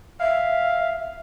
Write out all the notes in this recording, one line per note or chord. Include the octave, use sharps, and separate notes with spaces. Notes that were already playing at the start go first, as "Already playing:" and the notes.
E5 F5